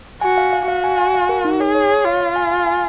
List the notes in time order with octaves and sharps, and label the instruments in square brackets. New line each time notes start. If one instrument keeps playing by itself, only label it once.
[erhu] F#4 [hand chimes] G#5
[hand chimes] F5
F5
[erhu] F#4 [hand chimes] F5
[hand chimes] G#5
G#5
F5
A#4
D#4
[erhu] G#4 [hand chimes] C#5
[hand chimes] C#5
C#5
[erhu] F4 [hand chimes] F5
[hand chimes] F5
G#5
F5
G#5